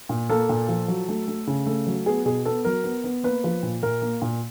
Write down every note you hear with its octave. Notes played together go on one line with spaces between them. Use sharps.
A#2
A#3 A4
A#2
F3
F#3
A3
A3
C#3
A3
F#3
B3 G#4
B2 G#4
B3 A4
F#3 A#4
B3
B3
A#3 B4
F3
A#2
A#2 A#4
A#3
A#2